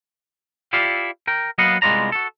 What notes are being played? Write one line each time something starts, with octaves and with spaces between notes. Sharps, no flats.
E4 F4 G4 A4 D5 F5
A#4 G5
F#3 A#3 B3 D#5 F5 F#5
C2 G#3 B3 F4 D5 A#5
F#4 A4